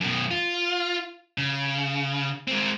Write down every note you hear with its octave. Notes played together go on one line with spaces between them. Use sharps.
F#2 B2
F4
C#3
G#3 C4